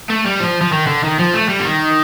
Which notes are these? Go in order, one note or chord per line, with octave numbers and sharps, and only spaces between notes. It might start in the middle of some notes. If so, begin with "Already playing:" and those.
A3
G3
F3
F3
D#3
D3
D#3
F3
A3
G3
D3
D#3